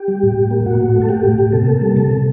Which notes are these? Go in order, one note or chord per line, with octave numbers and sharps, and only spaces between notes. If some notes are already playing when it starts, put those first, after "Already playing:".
Already playing: G4
G3
A2
A2
A#3
A2 F#4
A2
A3
A4
A3 G4
A2
A2
C3 A4
A#3
G3
C3 A4
C3